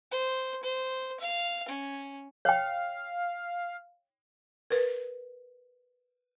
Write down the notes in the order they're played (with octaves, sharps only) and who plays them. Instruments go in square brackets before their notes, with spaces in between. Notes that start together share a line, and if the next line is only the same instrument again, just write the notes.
[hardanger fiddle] C5
C5
F5
C#4
[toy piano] C#5 G5 [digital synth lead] F5
[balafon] A#4 B4